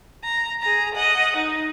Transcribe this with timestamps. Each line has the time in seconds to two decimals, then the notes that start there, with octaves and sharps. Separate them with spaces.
0.24 A#5
0.61 G#4 A#5
0.94 D#5 F#5
1.36 D#4